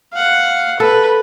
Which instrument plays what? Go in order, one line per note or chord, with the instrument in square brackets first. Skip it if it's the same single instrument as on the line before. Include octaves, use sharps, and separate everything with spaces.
[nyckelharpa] F5 F#5
[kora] A4 [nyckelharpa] B4